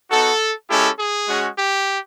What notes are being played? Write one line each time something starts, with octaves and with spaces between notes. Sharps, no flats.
B3 D#4 F#4 A4
G#3 C#4 E4 G4 A4
G#4
G#3 C#4 F#4
G4